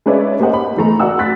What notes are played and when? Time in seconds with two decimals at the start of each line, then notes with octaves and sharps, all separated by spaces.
0.06 G#3 C#4 B4 C#5 D5 E5
0.40 A#3 G4 C5 D#5 F#5
0.53 B5
0.77 E2 A3 A#5
1.00 F#4 D5 F#5 E6
1.18 B5 F#6 A6 B6